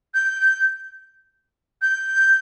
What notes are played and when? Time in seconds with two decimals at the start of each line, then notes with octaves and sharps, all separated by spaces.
0.14 G6
1.82 G6